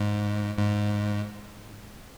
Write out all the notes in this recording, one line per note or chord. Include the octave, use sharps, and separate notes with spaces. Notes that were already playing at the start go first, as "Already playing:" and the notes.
Already playing: G#2
G#2